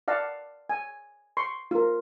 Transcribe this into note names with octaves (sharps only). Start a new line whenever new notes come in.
D5 F5 F#5 A5
G#5
C6 C#6
F4 A#4